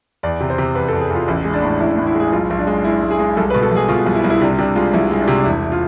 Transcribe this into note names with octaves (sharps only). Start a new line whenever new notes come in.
E2 D5
C3
C5
C3
E2 B4
A4
E2
G#4
E2 F4
A1 E4
G#3
D4
A2
A1 E4
A2
E4
G#3 G#4
B1 F4
B1
D4
G#3
G#3 E4
G#3
G#4
G#3
C2 A4
B4
B2
A4
C2
G#4
B2 F4
C2
E4
C2
E4
C3 D4
C3 D4
G#3 F4
C2 E4
G#3
D4
C3
D4
E1 E4
F4